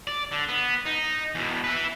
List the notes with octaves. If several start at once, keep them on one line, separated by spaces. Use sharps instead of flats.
D5
D3
B3
D#4
E2 B2
E4 B4